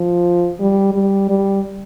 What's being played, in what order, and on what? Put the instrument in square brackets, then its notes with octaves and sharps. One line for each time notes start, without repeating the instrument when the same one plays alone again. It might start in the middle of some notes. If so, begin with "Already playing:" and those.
Already playing: [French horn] F3
G3
G3
G3